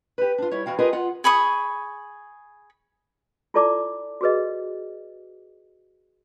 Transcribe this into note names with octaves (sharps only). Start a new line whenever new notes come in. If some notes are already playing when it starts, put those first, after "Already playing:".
G4 B4
D4 F4
G3 E4 C#5
E2 F#4 F5 G5
F4 G4 G#4 A#4 B4 D#5
F4 F#5
G#4 B5 C#6 D#6
E4 F4 A4 D5 A5 D6
F#4 G#4 B4 D#5